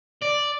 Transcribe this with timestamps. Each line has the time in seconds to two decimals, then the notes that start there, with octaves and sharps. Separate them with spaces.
0.22 D5